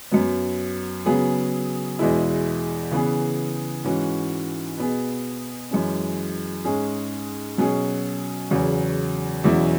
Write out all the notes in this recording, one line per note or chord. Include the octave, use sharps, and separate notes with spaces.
F#2 F#3 B3
C#3 F#3 B3 G#4
E2 B2 G#3 E4
C#3 E3 B3 G#4
G#2 E3 C#4 F#4
B2 B3 G#4
F#2 E3 G#3 C#4
G#2 G#3 C#4 G#4
B2 F#3 C#4 G#4
E2 C#3 F#3
E2 B2 F#3 C#4 E4